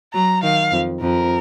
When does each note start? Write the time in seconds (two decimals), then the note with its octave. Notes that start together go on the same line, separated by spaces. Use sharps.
0.14 F#3 A#5
0.43 D#3 F5
0.72 F2
1.01 F2 A#4